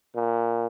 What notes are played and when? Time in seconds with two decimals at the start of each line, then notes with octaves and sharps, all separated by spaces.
0.15 A#2